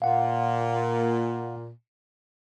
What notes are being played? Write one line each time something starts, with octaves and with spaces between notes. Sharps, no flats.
A#2 F5 F#5